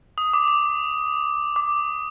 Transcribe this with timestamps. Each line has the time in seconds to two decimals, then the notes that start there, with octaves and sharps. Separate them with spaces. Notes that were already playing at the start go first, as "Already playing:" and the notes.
0.18 D#6
0.33 D6
0.48 D6
1.56 D6